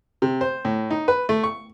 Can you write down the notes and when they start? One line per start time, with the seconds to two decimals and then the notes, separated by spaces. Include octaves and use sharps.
0.22 C3
0.41 C5
0.65 A2
0.91 D#4
1.08 B4
1.29 A3
1.43 C#6